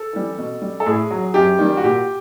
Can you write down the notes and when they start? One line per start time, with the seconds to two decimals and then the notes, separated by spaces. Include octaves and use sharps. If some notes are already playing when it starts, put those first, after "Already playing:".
Already playing: A4
0.13 E3 G3
0.38 B2
0.62 G3
0.80 A4
0.86 A2 G#4
1.11 F#3
1.34 F#2 G4
1.59 D#3 G3
1.77 F#4
1.84 A#2 G4